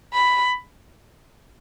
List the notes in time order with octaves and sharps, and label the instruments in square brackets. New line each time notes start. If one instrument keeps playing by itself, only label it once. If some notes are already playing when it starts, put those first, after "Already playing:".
[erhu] B5